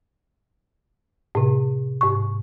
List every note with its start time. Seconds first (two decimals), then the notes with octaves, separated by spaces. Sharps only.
1.35 A2 C3
2.01 G#2 C#6